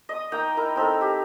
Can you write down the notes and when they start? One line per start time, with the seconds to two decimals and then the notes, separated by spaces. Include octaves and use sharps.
0.09 D#5 D#6
0.32 A#3 D#4 G5 A#5
0.57 E4 A#4
0.76 C4 D#4 A4 A#4
1.01 G4